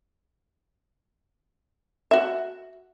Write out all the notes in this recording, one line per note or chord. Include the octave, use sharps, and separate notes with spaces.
F#4 E5